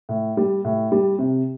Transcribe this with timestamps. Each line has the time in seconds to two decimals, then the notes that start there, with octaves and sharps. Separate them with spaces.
0.09 A2
0.37 G3
0.65 A2
0.92 G3
1.19 C3